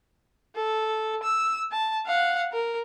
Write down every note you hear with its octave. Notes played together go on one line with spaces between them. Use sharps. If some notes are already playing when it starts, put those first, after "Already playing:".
A4
E6
A5
F5 F#5
A#4